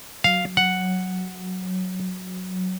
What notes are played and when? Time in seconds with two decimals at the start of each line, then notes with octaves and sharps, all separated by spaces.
0.24 F#3 F5
0.57 F#5